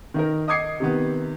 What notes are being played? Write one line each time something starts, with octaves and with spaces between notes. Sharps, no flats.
D#3 D#4 A#4
D#5 D6 D#6 G#6 C7 C#7
C3 D#3 B3